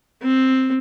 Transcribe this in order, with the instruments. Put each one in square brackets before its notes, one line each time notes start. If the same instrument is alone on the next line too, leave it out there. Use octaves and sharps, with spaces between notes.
[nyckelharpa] C4